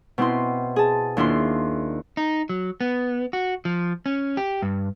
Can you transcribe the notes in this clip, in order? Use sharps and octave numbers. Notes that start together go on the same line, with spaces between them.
B2 C4 E4 D#5 C6
G#4 A5
D#2 D4 E4 F4 C6
D#4
F#3
B3
F#4
F3
C#4
G4
G2